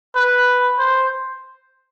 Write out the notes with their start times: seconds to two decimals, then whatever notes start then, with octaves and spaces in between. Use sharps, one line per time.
0.16 B4
0.79 C5